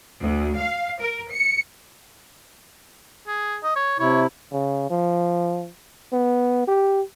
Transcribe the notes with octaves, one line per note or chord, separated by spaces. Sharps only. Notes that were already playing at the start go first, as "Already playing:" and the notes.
D2
F5
A#4
C#7
G#4
D#5
C#5
C3 E4 C#5
C#3
F3
B3
G4